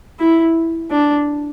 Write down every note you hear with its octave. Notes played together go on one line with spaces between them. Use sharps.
E4
D4